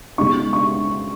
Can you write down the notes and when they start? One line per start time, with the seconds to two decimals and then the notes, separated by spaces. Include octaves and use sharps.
0.18 C#2 B2 G#3 D#4 C#6
0.53 C#6